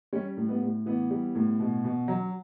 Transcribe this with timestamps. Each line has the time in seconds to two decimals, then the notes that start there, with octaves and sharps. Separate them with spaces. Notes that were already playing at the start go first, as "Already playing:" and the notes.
0.13 G3 C#4
0.37 A2
0.49 B3
0.62 A2
0.86 E3 B3
1.10 G3
1.35 A2
1.60 B2
1.84 B2
2.08 F#3